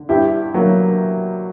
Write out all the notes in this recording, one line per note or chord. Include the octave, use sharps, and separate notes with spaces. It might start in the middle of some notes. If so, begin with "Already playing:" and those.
Already playing: D3
G2 E4 G4
D3 F#3 A#3